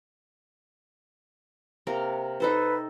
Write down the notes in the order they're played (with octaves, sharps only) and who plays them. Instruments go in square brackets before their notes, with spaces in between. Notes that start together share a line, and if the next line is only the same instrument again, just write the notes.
[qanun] C3 A#3 A#4
[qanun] D#4 A4 C5 [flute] B4